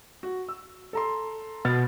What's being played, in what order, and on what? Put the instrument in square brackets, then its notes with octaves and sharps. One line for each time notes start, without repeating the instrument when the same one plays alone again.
[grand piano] F#4
E6
A4 A#5 C6
[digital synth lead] B2 [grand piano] F6 A6